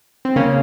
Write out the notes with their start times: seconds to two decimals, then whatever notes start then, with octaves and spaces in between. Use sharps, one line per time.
0.25 C4
0.36 C#3 A#3 C#4